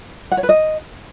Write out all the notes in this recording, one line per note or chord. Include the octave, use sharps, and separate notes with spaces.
F#5
C#5
B4
D#5